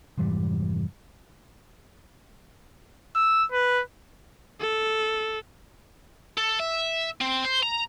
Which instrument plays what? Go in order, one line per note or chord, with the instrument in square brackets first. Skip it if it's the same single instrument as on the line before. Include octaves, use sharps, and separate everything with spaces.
[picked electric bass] F1 G#2 E3 G3
[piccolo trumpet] E6
B4
[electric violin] A4
[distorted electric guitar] A4
E5
C4
C5
A#5